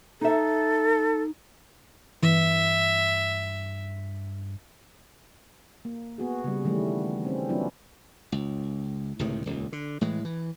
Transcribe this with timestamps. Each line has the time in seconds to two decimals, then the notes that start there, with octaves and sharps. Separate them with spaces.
0.21 D#4 A4 E5
2.23 G2 E3 E5
5.85 A#3
6.18 B3 F#4 G#4
6.44 C#3 G3
6.65 D#3 E3 G3 A3 C#4
7.25 C4 C#4
7.49 F#3 B3 C#4 D4 E4 F4
8.32 C#2
9.19 C#2 A2 C3 D#3
9.46 D#1 C#2
9.72 D3
10.01 A2 E3 G#3
10.25 E3